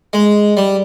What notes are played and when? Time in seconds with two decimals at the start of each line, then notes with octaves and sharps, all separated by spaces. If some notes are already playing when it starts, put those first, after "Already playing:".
0.13 G#3
0.57 G3